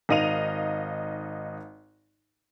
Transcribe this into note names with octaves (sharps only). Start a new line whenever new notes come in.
G#1 D#4 D#5 F5 D#7 F7